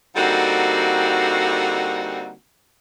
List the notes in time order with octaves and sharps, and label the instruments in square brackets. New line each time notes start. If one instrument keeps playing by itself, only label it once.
[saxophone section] D3 G3 A#3 C4 D#4 F#4